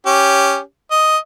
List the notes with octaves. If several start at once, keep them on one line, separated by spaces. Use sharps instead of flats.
C#4 G4
D#5